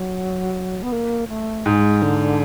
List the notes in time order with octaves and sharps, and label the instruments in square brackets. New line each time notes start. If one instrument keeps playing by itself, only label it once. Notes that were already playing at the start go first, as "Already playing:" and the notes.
Already playing: [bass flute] F#3
B3
A#3
A3
[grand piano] G#2 [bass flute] G#3
[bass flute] D3